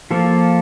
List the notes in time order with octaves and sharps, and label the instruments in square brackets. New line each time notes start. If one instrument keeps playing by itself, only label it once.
[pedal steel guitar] F3 A#3 F4 A4